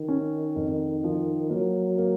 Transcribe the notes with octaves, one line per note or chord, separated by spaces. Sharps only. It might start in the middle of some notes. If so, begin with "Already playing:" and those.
Already playing: D#3
C#4
F2
F3
F#3 A#3
A#3